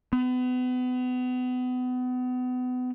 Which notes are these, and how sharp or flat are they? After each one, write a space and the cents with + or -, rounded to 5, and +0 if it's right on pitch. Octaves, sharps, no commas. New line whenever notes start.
B3 +30